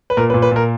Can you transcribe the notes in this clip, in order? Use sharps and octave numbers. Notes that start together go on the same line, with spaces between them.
B4
A#2 A#4
B4
A#2
B4
A#2 A#4